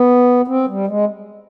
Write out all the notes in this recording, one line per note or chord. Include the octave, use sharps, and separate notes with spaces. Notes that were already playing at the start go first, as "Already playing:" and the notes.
Already playing: B3
C4
G3
G#3